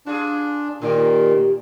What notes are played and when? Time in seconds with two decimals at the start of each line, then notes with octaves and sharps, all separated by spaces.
0.06 D4 F4 G#4
0.82 A#2 D#3 D4 G4 A#4